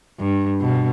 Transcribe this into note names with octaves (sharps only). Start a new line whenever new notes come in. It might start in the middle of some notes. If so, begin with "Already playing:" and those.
G2
B2